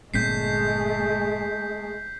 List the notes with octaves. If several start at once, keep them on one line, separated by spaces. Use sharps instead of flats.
G1 A#2 G#3 A3 C4 G6 B6 C7